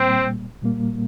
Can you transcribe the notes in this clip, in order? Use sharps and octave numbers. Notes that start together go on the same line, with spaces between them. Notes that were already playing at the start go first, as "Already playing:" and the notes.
Already playing: A#2 G3 A#3 C4
A#2 G3 A#3